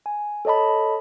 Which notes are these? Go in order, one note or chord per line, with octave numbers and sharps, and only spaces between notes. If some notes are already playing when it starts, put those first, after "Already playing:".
G#5
A4 C#5 D#5 A5 B5